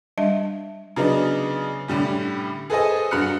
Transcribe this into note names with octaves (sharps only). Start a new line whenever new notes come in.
G3 D4 D#5 E5 A5
C#3 F#3 B3 D4 D#4
A2 D3 G3 C#4
G#4 A4 B4 C5 D#5 G#5
G2 F#4 B5 F6 F#6 C#7